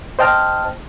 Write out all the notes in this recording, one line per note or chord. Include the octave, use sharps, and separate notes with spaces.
C5 D#5 G5 A5 F6